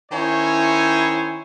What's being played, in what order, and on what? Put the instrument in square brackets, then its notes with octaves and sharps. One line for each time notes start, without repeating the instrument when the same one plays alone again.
[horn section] D#3 C#4 E4 C5 C#5 G#5